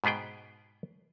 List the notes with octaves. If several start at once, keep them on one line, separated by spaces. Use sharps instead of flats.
G#2 B2 B3 G#4 G5